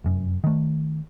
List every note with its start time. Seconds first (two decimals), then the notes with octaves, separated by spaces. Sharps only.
0.04 F1 F#2
0.44 D#3 A3